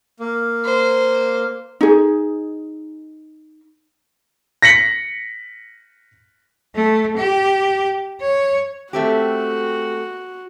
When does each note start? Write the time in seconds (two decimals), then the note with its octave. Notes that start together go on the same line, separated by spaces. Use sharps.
0.20 A#3
0.65 C5
1.81 D#4 G#4
4.62 A#6 B6 C#7 F#7
6.75 A3
7.17 G4
8.21 C#5
8.93 A3 C4 F#4 G4